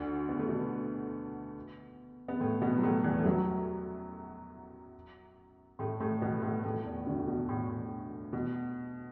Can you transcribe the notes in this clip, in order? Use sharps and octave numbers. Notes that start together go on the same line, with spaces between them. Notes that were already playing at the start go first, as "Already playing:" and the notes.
Already playing: D2 D3
B3
A3
B2 B3
B3
A2 A3
B2 B3
F#3
A2 A3
E2 E3
A3
F#2 F#3
A2 A3
A2 A3
B2 B3
A2 A3
A2 A3
E2 E3
D2 D3
B2
A2
A2
B2